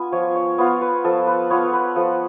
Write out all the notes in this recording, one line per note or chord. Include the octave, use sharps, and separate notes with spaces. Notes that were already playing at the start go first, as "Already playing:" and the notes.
Already playing: B3 F4 G#5
F3 C#5
C#5
B3 F4 C#5
B4
F3 A4
B4
B3 F4 C#5
B4
F3 A4